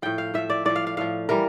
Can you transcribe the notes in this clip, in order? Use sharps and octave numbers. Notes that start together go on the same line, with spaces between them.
A2 F3 G5
F5
A2 F3 E5
D5
A2 F3 D5
F5
F5
A2 F3 F5
E3 G3 A#4